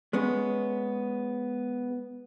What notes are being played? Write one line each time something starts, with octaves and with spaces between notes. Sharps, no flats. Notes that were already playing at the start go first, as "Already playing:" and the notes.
G#3 B3 C#4